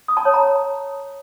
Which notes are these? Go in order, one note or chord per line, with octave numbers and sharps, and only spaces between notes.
D#6
A5
C#5
A#5